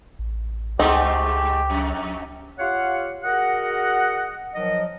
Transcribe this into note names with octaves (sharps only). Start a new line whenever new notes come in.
A1
C#2 G2 G#3 A3 C4 D#4 G4
F2
F4 G4 C#5 F5 F#5
F#4 G#4 A#4 D#5 F#5
D#3 F3 F#3 A#4 D#5